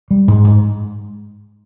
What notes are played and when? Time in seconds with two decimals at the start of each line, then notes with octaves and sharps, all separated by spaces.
0.11 G3
0.28 G#2
0.44 G#2